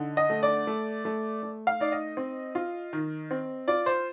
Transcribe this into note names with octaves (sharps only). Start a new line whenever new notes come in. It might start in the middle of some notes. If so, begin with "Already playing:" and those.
Already playing: D3 D#4
D#5
A3
D5
A3
A3
A3
F5
D#4 D5
D#5
C4
F4
D#3
C4
F4 D5
C5